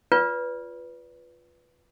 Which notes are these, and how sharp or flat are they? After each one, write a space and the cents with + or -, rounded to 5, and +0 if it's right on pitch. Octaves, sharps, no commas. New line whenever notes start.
F4 +0 B4 +0 D5 -35